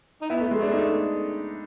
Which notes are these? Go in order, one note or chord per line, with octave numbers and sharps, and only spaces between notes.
D#4
B3 E4
A3
G#3
A3 D4
D#4